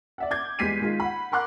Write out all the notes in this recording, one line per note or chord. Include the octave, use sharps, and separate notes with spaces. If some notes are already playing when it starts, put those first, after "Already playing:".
D5 E5 F#5
D6 G6 G#6
E2 G3 G#3 B6 C7 D#7
D#3 G#3 F4
F#5 B5
A#4 F#5 C6 D6 F#6